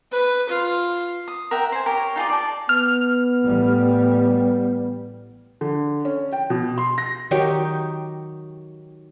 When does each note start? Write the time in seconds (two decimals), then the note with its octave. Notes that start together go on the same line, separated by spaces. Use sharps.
0.12 B4
0.48 F4
1.28 D#6
1.51 A#4 E5 F#5 G5
1.72 C5 G#5
1.86 G4 A#4 C#5
2.16 D#4 F4 G#4 D5
2.30 D5 A5
2.69 B3 F6
3.43 A1 G3
5.61 D3
6.05 C#4
6.33 G5
6.50 B2
6.78 C6
6.98 A#6
7.31 D#3 F#3 D#4 G4